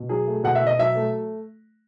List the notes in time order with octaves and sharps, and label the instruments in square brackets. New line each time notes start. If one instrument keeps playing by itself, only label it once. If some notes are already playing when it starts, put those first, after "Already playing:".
Already playing: [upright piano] B2
F#3 G#4
A3
B2 F#5
E5
B2
D#5
F#3 E5
A3